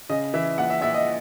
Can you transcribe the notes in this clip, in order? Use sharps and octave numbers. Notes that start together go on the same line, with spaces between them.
C#3 D#5
E3 E5
A#1 F#5
E5
A#1 E5
D#5